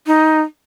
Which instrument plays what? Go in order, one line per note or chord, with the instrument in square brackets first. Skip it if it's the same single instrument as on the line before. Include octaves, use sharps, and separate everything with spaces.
[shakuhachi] D#4